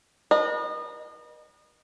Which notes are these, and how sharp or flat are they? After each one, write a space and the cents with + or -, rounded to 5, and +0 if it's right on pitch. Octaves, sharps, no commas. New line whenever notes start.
B4 -45 D#5 -30